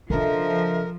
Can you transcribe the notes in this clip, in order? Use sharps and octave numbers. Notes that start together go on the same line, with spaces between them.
C#3 F3 D4 A4 A#4 D#5 E5